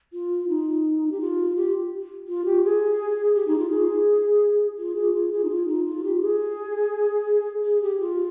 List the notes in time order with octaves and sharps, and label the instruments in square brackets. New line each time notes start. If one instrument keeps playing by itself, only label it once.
[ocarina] F4
D#4
G4
F4
G4
F4
G4
G#4
G4
D#4
F4
G#4
F4
G#4
F4
G#4
D#4
F4
D#4
F4
G4
G#4
G#4
G4
F4